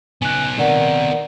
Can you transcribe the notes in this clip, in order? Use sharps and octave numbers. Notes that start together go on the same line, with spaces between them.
C#3 B3 D#4 G#5 F#6
C3 D#3 A#4 D5 F#5